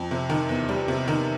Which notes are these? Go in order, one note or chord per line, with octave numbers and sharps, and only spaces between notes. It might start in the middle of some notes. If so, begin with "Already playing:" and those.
Already playing: F2
C3
D#3
E2
G3
C3
D#3